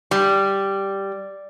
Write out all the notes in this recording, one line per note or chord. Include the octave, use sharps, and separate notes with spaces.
G3